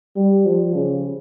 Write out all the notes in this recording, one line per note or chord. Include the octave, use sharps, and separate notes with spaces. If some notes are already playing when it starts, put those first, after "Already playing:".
G3
F3
C#3